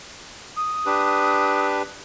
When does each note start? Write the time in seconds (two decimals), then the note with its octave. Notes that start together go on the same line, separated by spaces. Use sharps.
0.56 D#6
0.86 D4 G4 B4